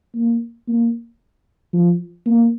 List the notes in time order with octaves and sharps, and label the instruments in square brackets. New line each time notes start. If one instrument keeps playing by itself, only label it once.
[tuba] A#3
A#3
F3
A#3